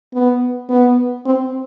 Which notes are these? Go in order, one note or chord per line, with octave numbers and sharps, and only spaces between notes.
B3
B3
C4